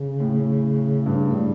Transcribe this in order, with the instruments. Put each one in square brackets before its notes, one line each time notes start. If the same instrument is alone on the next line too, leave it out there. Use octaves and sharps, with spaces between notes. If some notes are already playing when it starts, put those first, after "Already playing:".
Already playing: [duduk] C#3
[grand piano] A2
[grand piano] G2 [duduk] C#3
[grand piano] A2
[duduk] G3